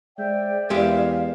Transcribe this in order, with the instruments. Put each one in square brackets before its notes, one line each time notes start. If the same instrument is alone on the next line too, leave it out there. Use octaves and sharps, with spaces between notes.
[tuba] G#3 [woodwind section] C5 E5 G5 [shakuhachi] D5
[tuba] E2 [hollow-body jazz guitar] G#3 G4 E5 [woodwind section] A#4 F5